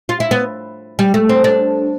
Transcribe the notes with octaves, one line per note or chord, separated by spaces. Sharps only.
F4
E4
B3
G3
A3
C4
D4